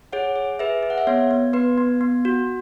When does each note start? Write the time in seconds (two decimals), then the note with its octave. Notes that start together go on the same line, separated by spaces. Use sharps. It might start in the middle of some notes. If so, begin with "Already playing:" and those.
0.13 G#4 C#5 F#5
0.36 G#4
0.59 G#4 B4 E5
0.83 G#4
0.90 F#5
0.98 E5
1.07 B3 C#5
1.31 B3
1.53 B3 B4
1.78 B3
2.01 B3
2.25 F#4